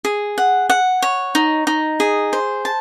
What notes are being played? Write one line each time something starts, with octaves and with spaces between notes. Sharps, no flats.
G#4
F#5
F#5
C#5
D#4
D#4
G#4
C5
A5